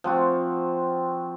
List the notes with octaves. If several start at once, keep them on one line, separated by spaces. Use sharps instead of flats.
F3 C4 F#4